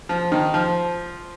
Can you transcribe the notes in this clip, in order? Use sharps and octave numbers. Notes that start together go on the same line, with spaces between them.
F3
D#3
F3